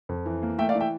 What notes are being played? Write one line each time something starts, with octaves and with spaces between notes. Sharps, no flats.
F2
E3
A#3
A3 E5 G5
D5 F5
E3
E5 G5